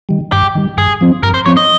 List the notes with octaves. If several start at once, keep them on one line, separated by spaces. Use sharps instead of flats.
D#3 G3
G2 G4
D#3 G3
G2 G#4
F3 C4
G2 A#4
C5
F3 C4 C#5
D#5